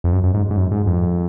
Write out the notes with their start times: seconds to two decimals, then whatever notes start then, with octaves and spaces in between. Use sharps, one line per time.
0.04 F2
0.13 F#2
0.24 F#2
0.34 G#2
0.50 G#2
0.57 F#2
0.72 G#2
0.86 F2